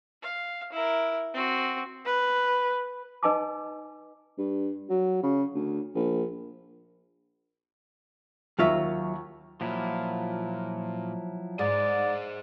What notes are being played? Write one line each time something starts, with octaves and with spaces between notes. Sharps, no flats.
F5
E4 A#4
C4 F#4
B4
D#4 B4 D#5 G#5 A5 D6
G2
F#3
C#3
D2
A#1
D#2 F#3 F4 E5 C#6
A#2 F3 F#3 E4
G#2 G#4 C5 D5